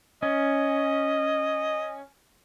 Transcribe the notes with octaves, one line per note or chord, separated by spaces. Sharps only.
C#4 D#5